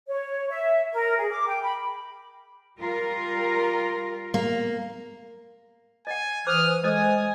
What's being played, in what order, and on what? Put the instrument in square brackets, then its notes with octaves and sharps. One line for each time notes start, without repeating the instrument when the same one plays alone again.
[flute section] C#5
E5
A#4
G#4
D6
G5
B5
[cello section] G3 F4 A#4
[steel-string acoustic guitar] A#3
[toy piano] D#5 F#5 [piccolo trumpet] G#5
[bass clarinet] E3 [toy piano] C5 D6 [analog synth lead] D#6 [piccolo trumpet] F6
[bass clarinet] G#3 [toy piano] A4 C5 D#5 [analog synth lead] G#5 [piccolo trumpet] D#6